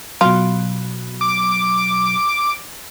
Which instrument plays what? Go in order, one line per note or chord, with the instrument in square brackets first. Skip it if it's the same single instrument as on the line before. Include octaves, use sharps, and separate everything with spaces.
[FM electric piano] B2 F#3 [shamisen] F4
[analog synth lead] D6